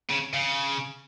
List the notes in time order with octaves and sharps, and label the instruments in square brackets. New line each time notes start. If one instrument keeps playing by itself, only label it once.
[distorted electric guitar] C#3
C#3